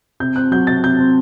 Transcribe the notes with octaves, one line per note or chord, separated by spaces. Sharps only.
C3 G6
C4 F#6
F#3 G6
C3 A6
C3 G6
C4